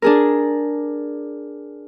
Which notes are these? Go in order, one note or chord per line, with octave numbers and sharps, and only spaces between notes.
D4 G#4 A#4